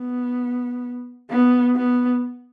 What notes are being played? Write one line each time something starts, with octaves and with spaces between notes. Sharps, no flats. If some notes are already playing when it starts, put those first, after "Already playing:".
Already playing: B3
B3
B3